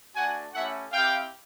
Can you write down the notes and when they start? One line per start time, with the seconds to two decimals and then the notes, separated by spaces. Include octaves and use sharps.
0.16 A3 D4 F#4 F#5 G#5
0.54 A3 C#4 E4 G4 E5 F#5
0.92 C4 E4 G4 F5 G5